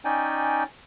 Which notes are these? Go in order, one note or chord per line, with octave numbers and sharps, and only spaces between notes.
C#4 D#4 D5 G5 G#5